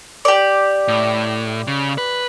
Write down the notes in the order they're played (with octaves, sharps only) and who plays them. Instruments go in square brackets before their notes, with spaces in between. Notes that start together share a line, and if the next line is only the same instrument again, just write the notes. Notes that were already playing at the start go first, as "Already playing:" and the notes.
[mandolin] G4 D5
[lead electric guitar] A2
C#3
B4